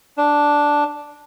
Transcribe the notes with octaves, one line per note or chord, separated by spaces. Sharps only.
D4